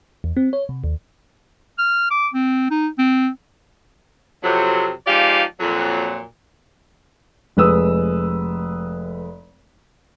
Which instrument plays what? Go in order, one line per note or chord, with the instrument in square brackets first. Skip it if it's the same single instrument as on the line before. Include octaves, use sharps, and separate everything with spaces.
[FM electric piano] E2
C4
C#5
C3
D#2
[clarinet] F6
D6
C4
D#4
C4
[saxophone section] F2 C3 F#3
F3 G#3 D#4 G4 D5 F5
F2 A#2 F#3
[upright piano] F1 G#3 B4 D#6 E6